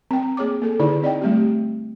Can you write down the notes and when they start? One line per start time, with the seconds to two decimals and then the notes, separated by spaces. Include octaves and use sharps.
0.11 C4 G5
0.37 A#3 G#4 C#5 D6
0.62 A#3 A4
0.80 D3 D#4 E4 G#4 D5
1.02 C4 D5 D#5 G5
1.22 G3 A3 C4 G4